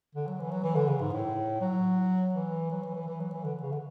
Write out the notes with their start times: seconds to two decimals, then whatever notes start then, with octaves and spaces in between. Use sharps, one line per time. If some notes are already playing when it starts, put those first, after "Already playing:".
0.15 D3
0.27 F#3
0.40 E3
0.51 F#3
0.63 E3
0.76 D3
0.87 C#3
1.01 G#2
1.12 A2
1.61 F#3
2.34 E3
2.71 F#3
2.83 E3
2.95 E3
3.08 E3
3.20 F#3
3.32 E3
3.44 D3
3.63 C#3
3.72 D3